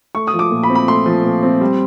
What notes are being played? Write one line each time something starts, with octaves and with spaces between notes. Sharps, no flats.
A3 C#6
D#6
F3
D6
A#2
B5
C4
B5
A3 C6
F3
A#2
C4
G3